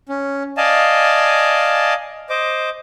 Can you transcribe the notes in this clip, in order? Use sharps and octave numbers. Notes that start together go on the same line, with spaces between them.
C#4
D5 D#5 F5 G#5 A5
C5 D#5 D6